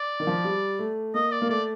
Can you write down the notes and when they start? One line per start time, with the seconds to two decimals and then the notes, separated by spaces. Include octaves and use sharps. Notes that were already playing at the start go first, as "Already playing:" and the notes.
Already playing: D5
0.20 D#3
0.27 F3
0.44 G3
0.79 A3
1.14 A#3 D#5
1.31 D5
1.42 A#3
1.49 A3 D5